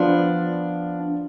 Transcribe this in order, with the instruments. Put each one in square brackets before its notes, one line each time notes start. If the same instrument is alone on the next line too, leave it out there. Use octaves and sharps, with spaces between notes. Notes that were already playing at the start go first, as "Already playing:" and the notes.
Already playing: [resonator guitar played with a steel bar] F3 B3 F4 [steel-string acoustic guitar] D4